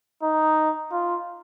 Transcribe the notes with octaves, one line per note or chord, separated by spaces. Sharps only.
D#4
F4